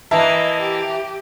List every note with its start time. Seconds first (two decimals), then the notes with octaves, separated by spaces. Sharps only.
0.11 E3 A#3 D#5 E5 A5
0.61 G4